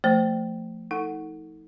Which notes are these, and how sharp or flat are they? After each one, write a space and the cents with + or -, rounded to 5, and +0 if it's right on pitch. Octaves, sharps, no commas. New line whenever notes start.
F3 +0 A3 +25 C5 +0
D#4 +35 A4 +20 F#5 +0